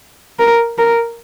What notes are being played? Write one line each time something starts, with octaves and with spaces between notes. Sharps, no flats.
A#4
A#4